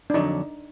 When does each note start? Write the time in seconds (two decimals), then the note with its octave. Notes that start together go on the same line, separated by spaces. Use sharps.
0.10 D4
0.14 F2 D3 F#3 D#4